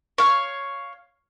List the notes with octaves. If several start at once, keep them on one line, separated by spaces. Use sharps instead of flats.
C#5 F5